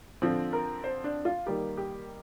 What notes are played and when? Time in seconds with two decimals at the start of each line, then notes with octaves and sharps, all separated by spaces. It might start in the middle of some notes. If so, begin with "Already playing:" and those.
0.22 D3 F3 C4
0.53 A#4
0.84 C5
1.04 D4
1.25 F4
1.46 D#3 G3 A#3 G4
1.77 G4